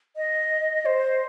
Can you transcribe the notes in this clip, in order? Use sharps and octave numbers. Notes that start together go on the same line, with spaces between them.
D#5
C5